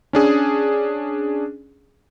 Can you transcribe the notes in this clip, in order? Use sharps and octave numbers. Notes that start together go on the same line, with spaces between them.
C#4 D4 G#4